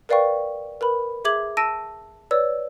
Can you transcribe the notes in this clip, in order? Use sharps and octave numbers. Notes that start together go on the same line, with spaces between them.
A#4 B4 D5 F5 G5 C#6
A#4 B4 B5
G#4 E5 D6 G#6 F#7
A5 E6 A#6 D7 D#7
B4 C#5 D5 E6